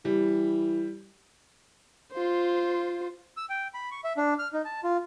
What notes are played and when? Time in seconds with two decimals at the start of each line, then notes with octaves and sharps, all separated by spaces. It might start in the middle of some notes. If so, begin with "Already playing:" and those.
0.05 E3 G3
2.13 F4 C5
3.37 E6
3.49 G5
3.74 B5
3.91 C#6
4.04 E5
4.17 D4
4.39 F6
4.53 D#4
4.65 A5
4.84 F4